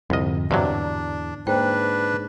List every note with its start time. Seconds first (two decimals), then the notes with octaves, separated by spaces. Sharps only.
0.10 C2 F2 G#2 D3 D#5
0.51 E2 G2 C3 F#3 D4 D5
1.47 G#2 A#3 D4 B4 C5 G5